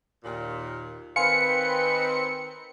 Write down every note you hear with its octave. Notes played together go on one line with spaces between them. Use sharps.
D#2 A#2
D#3 C4 B4 F5 G#5 C6 C#7